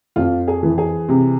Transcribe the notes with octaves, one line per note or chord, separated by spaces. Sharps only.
F2 F4
G#4
E3
G#4
C3